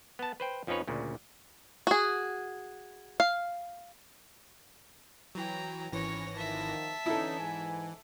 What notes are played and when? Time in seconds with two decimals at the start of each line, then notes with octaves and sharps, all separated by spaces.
0.19 B3 A5
0.40 B4 C5 G5
0.67 F2 F3 C#4 D#4 B4 C#5
0.87 D2 A#2 C#3
1.87 F#4 G#4
3.20 F5
5.35 E3 F#3 G5 A#5
5.92 G#1 E3 C#4 C#5 A#6
6.34 D#3 F3 E5 A5
7.06 D3 E3 C#4 D#4 E4 A4
7.39 G#2 G#5